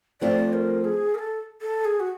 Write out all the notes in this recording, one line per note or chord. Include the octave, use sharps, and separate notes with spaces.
F3 A3 C4 F4 D5
A#4
G#4
A#4
A4
A4
G#4
F#4